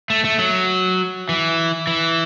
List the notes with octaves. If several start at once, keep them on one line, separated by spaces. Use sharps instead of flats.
A3
A3
F#3
E3
E3